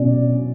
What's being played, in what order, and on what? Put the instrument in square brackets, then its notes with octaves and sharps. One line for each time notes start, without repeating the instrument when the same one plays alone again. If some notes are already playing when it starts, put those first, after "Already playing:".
Already playing: [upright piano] B2 C#4 D5